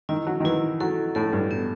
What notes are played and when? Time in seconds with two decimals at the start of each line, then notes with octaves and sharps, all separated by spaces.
0.09 D#3 E4
0.27 F#3
0.40 D#3
0.44 E3 E4
0.80 F#3 A4
1.15 A2 A4
1.33 G2
1.51 B3